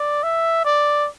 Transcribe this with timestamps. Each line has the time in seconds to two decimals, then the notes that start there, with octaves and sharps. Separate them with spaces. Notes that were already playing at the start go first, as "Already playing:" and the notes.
Already playing: D5
0.23 E5
0.65 D5